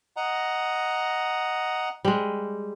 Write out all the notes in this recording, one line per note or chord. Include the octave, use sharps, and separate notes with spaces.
D#5 F#5 A#5
G3 G#3